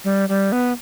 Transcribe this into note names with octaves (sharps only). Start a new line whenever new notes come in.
G3
G3
B3